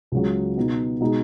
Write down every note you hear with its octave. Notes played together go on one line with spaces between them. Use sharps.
C#2 C#3 F#3
B2 B3 D#4
B2 G#3 D#4